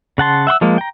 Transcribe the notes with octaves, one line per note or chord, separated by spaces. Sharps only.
C#3 F#5 A5 C6
E5 F#5 C6 E6
F3 G#3 A#3
G5 A#5